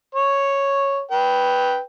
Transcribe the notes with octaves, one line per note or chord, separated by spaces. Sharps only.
C#5
B4 G5